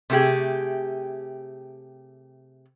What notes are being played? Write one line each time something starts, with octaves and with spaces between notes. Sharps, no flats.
C3 A3 G4 G#4